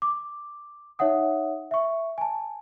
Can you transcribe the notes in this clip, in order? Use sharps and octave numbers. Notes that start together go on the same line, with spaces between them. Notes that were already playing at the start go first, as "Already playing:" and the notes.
D6
D#4 C#5 E5 F#5 D#6
E5 C#6
G#5 A5